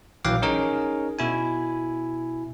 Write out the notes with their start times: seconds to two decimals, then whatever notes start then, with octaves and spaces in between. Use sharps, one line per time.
0.25 A#1 E3 F#3 F5 G5 D6
0.42 C#4 D#4 G#4 A#4 C#5
1.19 B2 E4 G#5